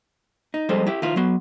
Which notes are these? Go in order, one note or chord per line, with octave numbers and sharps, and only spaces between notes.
D#4
F2 G3 G#3 A4 C5 D#5
E4 G4
D#3 E4 F4
F#3 B3 C6